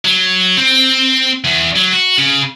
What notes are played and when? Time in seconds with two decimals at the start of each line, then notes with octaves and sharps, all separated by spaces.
0.05 F#3
0.57 C4
1.44 E2
1.76 F#3
1.92 F#4
2.18 C#3